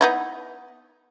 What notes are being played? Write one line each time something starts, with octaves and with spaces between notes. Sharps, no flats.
B3 D#4 E4